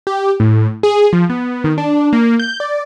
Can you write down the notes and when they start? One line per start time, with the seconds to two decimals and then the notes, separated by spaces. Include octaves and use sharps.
0.07 G4
0.40 A2
0.83 G#4
1.13 F3
1.30 B3
1.64 D#3
1.78 D4
2.13 A#3
2.40 G6
2.60 D5